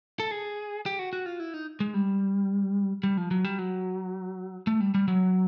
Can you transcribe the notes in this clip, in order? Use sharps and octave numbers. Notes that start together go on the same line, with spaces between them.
A4
G#4
G4
F#4
F#4
F4
E4
D#4
G#3
G3
G3
F3
F#3
G3
F#3
A3
G3
G3
F#3